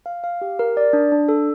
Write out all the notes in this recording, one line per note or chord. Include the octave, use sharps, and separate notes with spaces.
F5
F5
G4
A#4
D5
D4
D4
A4